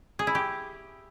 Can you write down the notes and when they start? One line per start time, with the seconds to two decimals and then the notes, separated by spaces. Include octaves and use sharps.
0.19 G#4
0.27 E4
0.35 G4